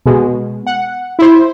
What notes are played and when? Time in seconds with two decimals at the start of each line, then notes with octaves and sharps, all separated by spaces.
0.06 B2 G#3
0.67 F#5
1.19 E4 C5